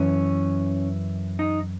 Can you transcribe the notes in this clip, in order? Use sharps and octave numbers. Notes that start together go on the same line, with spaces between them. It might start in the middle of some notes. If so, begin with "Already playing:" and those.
Already playing: F#2 E3 C#4
D#4